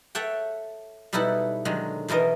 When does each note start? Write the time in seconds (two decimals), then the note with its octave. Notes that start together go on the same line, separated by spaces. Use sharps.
0.15 A4 C#5 E5 F#5 G5
1.13 B2 G3 D#4 E4 A4 F#5
1.65 D3 D#3 F#3 G#3
2.08 E2 B2 E3 A#4 D#5